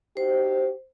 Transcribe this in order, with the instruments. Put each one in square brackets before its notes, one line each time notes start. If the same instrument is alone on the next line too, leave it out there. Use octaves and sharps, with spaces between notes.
[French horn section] D#4 F#4 G4 [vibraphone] C5